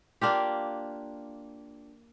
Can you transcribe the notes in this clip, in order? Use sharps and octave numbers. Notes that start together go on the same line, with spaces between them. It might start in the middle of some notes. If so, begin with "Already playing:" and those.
A#3 D4 F4 G4